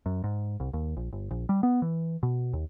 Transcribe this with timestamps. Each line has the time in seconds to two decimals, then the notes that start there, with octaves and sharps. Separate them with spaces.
0.06 F#2
0.24 G#2
0.60 C2
0.73 D#2
0.97 A#1
1.13 G1
1.31 A#1
1.49 G3
1.63 B3
1.82 E3
2.23 B2
2.53 D#2